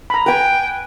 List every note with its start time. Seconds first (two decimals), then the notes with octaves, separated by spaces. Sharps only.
0.10 A#5 B5
0.26 B4 G5 G#5